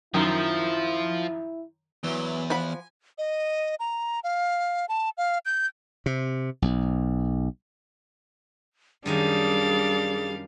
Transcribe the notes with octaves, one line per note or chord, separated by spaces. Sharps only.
F#2 D#3 F3 E4
E2 E3 F#3
F3 F#5 G#5 B5
D#5
A#5
F5
A5
F5
G6
C3
B1
F#2 D#3 G3 D4 G#4 E5 F5 A6